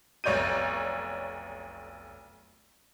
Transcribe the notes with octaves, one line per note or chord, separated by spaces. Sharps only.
F1 B1 C#5 D5 G6 D#7